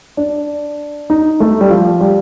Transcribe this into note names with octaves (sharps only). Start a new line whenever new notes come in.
D4
D#4
A3
G3
F3
G3